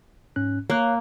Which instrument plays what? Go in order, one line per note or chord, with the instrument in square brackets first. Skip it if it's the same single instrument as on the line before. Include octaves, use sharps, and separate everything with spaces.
[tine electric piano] G#2 C#4 F#6
[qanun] A#3 [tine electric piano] C#5 F5 F#6